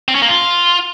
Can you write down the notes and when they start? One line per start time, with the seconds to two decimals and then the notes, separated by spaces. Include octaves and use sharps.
0.08 C4
0.15 C#4
0.22 A#3
0.29 F4